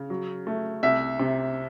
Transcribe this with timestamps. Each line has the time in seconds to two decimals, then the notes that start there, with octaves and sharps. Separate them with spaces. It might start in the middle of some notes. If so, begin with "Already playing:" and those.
Already playing: C#3
0.10 F#3
0.47 A3
0.83 C2 E5
1.19 C3